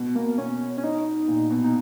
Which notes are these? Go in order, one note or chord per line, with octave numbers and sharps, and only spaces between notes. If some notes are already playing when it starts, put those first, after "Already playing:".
Already playing: B2
B2 A#3
B2 C#4
C#4
D#4
A#2
B2
D#4